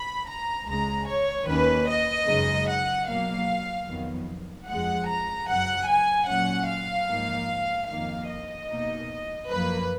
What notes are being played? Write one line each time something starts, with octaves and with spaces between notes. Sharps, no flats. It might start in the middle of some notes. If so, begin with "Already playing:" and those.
Already playing: B5
A#5
C#2 C#3 G#3 A#5
C#5
D#2 D#3 A#3 C#4 B4
D#5
F#2 C#3 G#3 D#4
F#5
B2 F#3 A#3 F5
F2 D#3 F#3 B3
F2 F3 G#3 F#5
A#5
F#2 C#3 F#3 F#5
G#5
A#2 F#3 C#4 F#5
F5
G#2 F3 A#3 D#4
F2 D#3 A#3 F5
D#5
B2 A#3 D#4
F#2 F3 A#3 B4